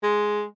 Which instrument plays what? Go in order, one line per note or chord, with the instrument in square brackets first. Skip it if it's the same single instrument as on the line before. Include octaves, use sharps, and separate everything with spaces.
[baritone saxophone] G#3